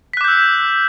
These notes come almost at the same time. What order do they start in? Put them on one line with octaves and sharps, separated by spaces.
B6 F#6 D6 G6 E6